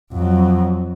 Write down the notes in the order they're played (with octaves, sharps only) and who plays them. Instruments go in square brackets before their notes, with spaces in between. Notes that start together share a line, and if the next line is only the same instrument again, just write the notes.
[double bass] F2 F#3